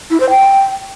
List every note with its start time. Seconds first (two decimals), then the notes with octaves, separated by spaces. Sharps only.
0.11 E4
0.20 C5
0.30 G5